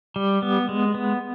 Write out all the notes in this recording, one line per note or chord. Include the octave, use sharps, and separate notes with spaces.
G3
B3
G#3
B3